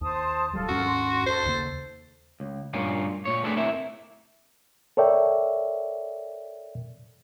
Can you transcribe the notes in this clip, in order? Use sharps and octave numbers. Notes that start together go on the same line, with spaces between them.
D#2 C5 A5 D#6
D1 F#3 G3 F4 A4
D#2 G#2 C#4 F#4
C6
D#2 A4 C5
D#2 C#3 A#3
C#2
G2 A#2 C#4 F4
A#2 C#5
A3 B3 C4 D4 G#4 B4
A#3 C4 E4 E5
A4 A#4 C#5 D5 E5 G5